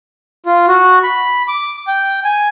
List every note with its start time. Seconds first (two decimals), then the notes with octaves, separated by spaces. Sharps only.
0.46 F4
0.68 F#4
1.03 B5
1.48 D6
1.87 G5
2.24 G#5